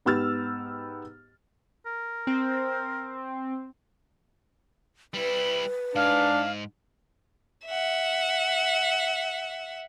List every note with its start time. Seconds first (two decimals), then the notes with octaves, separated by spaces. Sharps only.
0.05 G#2 B3 G4 E6 F6 A6
1.86 A#4
2.27 C4
5.14 G3 E4 B4
5.95 G#2 D4 F5
7.66 E5 F#5